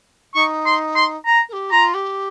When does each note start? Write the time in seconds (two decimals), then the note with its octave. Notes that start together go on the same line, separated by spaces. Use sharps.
0.34 D#4 C#6
0.66 C6
0.95 C6
1.26 A#5
1.48 A#4
1.52 G4
1.72 F4 A#5
1.94 G4